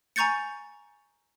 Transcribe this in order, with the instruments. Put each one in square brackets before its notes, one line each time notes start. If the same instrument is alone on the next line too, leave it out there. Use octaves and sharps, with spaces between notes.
[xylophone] G#5 A#5 C#6 G6 A6 C#7